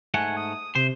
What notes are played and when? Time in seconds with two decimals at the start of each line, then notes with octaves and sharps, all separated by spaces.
0.14 G#2 A3 F#5 G#5
0.37 D#6
0.75 C3 C5